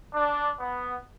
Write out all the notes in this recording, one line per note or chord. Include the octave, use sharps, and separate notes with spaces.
D4
B3